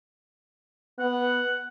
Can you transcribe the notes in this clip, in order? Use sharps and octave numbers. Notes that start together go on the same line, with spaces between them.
B3 F#5